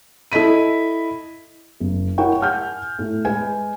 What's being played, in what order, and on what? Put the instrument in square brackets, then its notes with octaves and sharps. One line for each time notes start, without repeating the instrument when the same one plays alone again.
[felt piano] E4 A4 D#5 B6 D#7
F#1
E4 A#4 C#5 F#5 G5 C#6
F#5 G#5 F6 G6
A2
G#3 G#4 B4 G#5